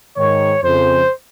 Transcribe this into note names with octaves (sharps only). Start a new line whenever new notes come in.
G#2 D#3 C#5
F2 C#3 C5